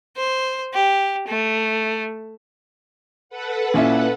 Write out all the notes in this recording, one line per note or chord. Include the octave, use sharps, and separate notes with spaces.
C5
G4
A3
A4 B4 F#5
A#2 C#4 E4